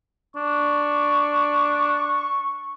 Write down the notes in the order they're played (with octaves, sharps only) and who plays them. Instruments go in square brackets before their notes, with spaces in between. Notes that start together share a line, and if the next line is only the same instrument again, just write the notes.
[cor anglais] D4 [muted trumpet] C#6